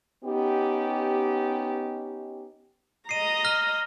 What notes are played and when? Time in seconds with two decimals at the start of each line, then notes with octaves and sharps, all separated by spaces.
0.24 B3 C#4 D#4 G4
3.09 D#5 A#5 C7 D#7
3.45 F6 A#6 G7